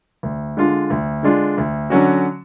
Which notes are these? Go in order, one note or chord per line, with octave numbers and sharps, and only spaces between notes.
D2
D3 G#3 D4 F4
D2
D3 G#3 D4 F4
D2
D3 F#3 C#4 F#4